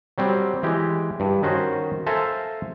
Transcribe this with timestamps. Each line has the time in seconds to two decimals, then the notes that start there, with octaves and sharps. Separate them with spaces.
0.18 F#3 G3 C4
0.63 E3 G#3 G4
1.20 G2
1.42 D#3 C#4 F#4 C5
2.06 A4 C5 E5 F5 G#5 A#5